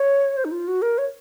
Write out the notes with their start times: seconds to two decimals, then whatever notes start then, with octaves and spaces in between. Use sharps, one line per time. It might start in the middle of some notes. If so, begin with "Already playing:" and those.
Already playing: C#5
0.37 C5
0.45 D#4
0.52 F4
0.68 F#4
0.82 A#4
0.98 C#5